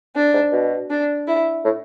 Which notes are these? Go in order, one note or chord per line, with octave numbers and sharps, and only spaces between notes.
D4
G#2
B2
D4
E4
A2